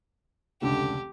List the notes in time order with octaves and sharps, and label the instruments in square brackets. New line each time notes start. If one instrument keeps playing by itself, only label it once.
[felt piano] F1 C#2 D3 [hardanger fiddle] G4